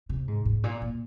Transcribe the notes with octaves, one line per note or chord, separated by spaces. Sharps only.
C3
G#2
G#2
A#2
A#2